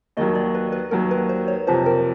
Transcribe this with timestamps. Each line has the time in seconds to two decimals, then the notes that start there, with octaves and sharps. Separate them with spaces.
0.17 D#2 D#3 F#3 D#5
0.35 D5
0.55 B4
0.72 B4
0.91 D#2 D#3 F#3 A#4
1.11 B4
1.29 C5
1.48 C#5
1.67 F2 C3 F3 C5
1.86 A#4